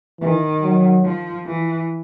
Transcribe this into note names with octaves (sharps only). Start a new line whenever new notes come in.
D#3 E3
F#3
F3
E3